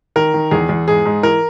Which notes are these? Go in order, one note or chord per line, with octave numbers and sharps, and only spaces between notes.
D#3 A#4
D#3
E2 G#4
E2
G#2 G#4
G#2
E3 A#4